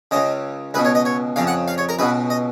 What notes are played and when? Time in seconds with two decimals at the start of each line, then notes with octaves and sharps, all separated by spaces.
0.11 C#2 C#3 D#5
0.74 C#2 B4
0.78 B2
0.85 C#5
0.95 D#5
1.05 C#5
1.36 F2 C#3 F5
1.47 F#5
1.68 F5
1.78 C#5
1.89 A#4
1.99 C#2 B2 B4
2.30 D#5